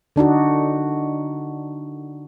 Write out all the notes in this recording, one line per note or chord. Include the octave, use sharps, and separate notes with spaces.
D3 D4 D#4 F#4